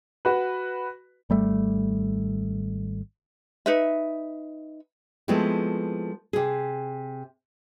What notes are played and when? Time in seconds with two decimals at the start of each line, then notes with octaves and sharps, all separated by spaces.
0.25 F#4 B4
1.30 G#1 G3 A3
3.66 D#4 B4 E5
5.28 F3 G#3 A3 B3 C4 E4
6.33 C3 G#4